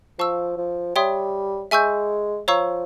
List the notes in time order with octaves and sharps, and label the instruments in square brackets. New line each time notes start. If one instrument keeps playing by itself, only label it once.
[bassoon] F3 [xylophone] F5 A5 C#6 E6
[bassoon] F3
[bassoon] G3 [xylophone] C#5 E5 G5 C6 D#6
[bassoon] G#3 [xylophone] E5 G#5 C#6 E6 G6
[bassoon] F3 [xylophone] C#5 F5 A#5 C#6 E6